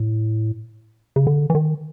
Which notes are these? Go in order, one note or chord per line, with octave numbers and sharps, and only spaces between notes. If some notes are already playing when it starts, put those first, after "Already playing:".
Already playing: A2
C#3
D3
E3
D#3